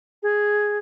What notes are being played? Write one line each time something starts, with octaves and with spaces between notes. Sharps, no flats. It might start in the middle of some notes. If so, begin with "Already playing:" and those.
G#4